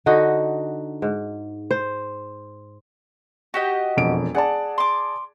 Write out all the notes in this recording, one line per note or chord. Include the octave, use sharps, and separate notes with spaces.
D3 D#4 F#4 D#5
G#2
C5
F#4 G4 D#5
E1 F2 D7
G#4 D5 F#5 A5
C6 D6